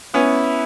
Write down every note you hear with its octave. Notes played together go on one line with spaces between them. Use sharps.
B3 C#4 E4